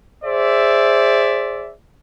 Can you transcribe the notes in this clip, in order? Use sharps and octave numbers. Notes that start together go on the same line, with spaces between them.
G#4 C5 D5 E5